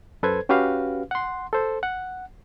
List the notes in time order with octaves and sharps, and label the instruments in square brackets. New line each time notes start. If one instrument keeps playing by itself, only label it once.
[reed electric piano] F#2 A4 B4 C5 G#6
C#4 F#4 G4 B4 F5
F#5 C6
A4 C5
F#5